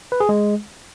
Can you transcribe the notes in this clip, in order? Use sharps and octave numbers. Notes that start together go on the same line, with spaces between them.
B4
G#4
G#3